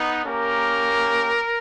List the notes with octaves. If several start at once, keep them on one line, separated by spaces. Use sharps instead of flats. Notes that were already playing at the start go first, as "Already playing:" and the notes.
Already playing: B3 D#4
A#3 C#4 G4 A#4